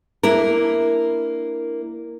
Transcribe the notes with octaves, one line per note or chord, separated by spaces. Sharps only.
A#3 D4 E4 A#4